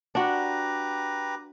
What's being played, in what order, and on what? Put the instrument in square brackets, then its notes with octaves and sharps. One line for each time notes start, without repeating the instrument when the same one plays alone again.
[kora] D4 F#4 [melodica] G4 B4 A#5